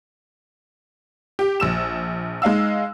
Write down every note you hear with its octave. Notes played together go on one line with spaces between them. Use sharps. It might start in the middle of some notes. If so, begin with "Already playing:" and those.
G4
A#1 E6 E7
G#3 D#4 F5 E6